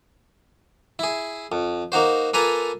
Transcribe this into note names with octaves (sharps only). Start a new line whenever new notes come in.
E4 G#4
F2
A#3 D#4 F#4 C5
A#3 F4 A4 B4 G#5 A#5